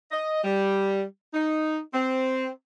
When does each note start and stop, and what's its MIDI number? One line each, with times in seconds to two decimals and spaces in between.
0.11 0.41 75
0.43 1.02 55
1.34 1.78 63
1.93 2.48 60